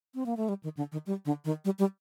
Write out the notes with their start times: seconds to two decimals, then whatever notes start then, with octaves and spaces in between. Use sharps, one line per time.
0.15 C4
0.26 A#3
0.37 A3
0.49 G3
0.64 D#3
0.77 D3
0.92 D#3
1.07 G3
1.25 D3
1.45 D#3
1.65 G3
1.79 G3